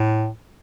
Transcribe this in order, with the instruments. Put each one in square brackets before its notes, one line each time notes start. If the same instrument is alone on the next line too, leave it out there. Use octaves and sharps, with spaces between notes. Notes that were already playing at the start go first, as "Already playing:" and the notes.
Already playing: [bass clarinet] A2